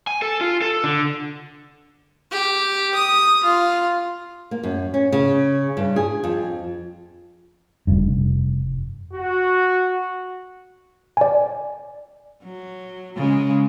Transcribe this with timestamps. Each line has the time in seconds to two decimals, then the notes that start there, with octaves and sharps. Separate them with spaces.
0.07 G#5
0.22 A4
0.41 F4
0.61 A4
0.84 D3
2.31 G4
2.94 D#6
3.44 F4
4.51 A#3
4.63 F#2
4.94 C#4
5.12 C#3
5.77 G2
5.96 G#4
6.24 F2
7.87 F1 G2
9.14 F#4
11.17 D5 G#5
12.43 F#3
13.16 C#3 G#3